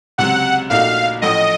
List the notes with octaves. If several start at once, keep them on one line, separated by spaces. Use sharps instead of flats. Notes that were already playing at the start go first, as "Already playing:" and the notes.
C#2 C3 F#3 C4 F#5
A#1 A#2 A3 D#4 F#4 F5
A1 A2 F3 D#5